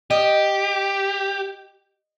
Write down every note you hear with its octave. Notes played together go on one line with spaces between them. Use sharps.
G4 D#5